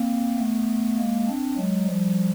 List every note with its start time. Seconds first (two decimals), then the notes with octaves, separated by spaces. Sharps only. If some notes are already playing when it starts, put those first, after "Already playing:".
Already playing: A#3 C4
0.38 A3 B3
0.98 G#3 A#3
1.27 C4 D4
1.56 F#3 G#3
1.86 F3 G3